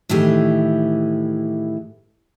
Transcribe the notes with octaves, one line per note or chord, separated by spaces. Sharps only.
A2 D#3 E3 G4 G#4